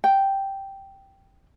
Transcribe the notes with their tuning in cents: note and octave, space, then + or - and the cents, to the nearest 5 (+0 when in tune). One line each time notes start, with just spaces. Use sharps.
G5 -5